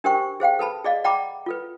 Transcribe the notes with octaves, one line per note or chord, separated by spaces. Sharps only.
D4 G4 A#4 C5 G5 C#6
G#4 C5 F5 G5
A4 B4 A5 B5
G#4 D5 D#5 F5
D5 F#5 G5 A#5 B5 D6
F4 A4 B4